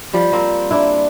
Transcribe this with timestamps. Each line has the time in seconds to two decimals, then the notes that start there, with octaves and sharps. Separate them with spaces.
0.13 F3 G3
0.33 A#3 C4
0.71 D4 E4